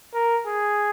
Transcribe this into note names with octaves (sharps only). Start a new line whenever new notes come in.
A#4
G#4